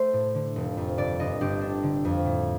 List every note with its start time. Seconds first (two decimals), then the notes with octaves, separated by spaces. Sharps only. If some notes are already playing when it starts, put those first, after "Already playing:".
Already playing: A3 C5
0.13 A2
0.34 D3
0.56 F1
0.77 F2
0.98 G1 D5
1.19 G1 D#5
1.41 G1 G4
1.61 D4
1.83 D3
2.05 F2
2.25 A2